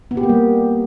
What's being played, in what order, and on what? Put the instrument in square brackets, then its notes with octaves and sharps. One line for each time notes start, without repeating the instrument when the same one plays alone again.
[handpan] B3
G4
A#3
G3